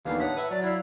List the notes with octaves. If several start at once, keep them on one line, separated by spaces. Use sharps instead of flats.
D#2 D3 E3 F3 G3 B3 F5
A2 C#5 F#5 A#5 D#6 B6
B4 E5
F#3 D5
E4 D5 F5 F#5 G#6